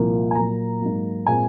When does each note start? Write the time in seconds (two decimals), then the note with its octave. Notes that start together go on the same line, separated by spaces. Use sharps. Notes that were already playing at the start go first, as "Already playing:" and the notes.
Already playing: C2 A#2 F3 A#3
0.31 G#5
0.35 A#2 F#3 A#3 A#5
0.81 G#2 F#3 A#3
1.26 A#2 G#3 C4 G#5